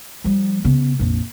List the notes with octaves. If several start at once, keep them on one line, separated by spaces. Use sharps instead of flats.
F3 G3
C#3 B3
A#1 F2